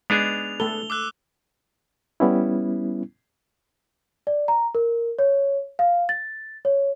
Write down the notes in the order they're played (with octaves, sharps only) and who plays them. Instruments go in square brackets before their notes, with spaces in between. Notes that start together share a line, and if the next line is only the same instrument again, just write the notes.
[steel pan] G#3 [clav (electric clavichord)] B3 D4 G#4 [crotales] F7
[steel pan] A3 A4 [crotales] G7
[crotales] D6 E6 F#6
[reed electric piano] G3 B3 C#4 E4
[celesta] D5
A#5
A#4
C#5
F5
A6
C#5